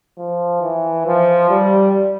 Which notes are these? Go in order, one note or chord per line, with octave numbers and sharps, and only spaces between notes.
F3
E3
F3
G3